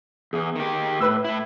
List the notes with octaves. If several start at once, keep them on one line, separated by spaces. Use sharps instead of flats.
E2 E3 G#4
D#3 G4
A2 B4 E6
A2 E4